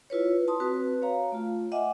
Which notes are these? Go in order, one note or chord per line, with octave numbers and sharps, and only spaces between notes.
E4 F4 B4 C#5
A5 C6 D#6
C4 F#4 B4
C#5 F5 A#5
A3 F4
D#5 E5 F#5 G#5 D6